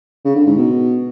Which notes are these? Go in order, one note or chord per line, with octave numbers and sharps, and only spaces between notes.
C#3
D3
G#2
B2